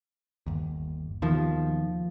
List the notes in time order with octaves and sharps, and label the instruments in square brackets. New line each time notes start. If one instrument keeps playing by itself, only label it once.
[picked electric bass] G1 D#2
[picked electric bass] D#2 B2 D#3 [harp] F3